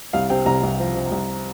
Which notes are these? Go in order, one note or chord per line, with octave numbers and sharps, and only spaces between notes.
C2 F5
C3 G5
C2 A#5
C2
F3
C3
C2